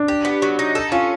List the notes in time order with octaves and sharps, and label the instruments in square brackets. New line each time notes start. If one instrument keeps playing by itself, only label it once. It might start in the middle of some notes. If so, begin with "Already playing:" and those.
Already playing: [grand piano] D4
[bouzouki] G4
B3
F#3
D#4
A4
[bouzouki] C#4 [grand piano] F4